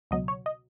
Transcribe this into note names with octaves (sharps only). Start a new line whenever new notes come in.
C#2 B2 F#3 D#5
C#5
D#5